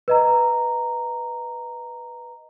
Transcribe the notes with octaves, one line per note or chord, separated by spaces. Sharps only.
B4 D#5 A#5